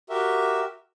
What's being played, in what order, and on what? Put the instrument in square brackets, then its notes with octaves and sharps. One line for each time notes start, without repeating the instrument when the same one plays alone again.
[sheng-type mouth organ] F#4 G4 A#4 E5